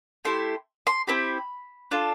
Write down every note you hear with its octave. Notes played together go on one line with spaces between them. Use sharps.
A3 E4 G4 C6
C6
C4 E4 G4 B5
D4 F4 A4